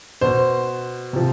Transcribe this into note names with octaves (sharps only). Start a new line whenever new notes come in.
B2 C5
C3 F3